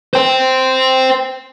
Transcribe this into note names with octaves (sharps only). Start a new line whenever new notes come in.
C5 G5